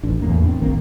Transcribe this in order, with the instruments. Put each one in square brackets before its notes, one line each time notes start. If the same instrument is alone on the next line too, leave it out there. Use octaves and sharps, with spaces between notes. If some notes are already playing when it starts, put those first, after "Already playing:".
[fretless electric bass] A1 D4
E2 A2 A#3
C4 D4
E1 A#1 D#3 A#3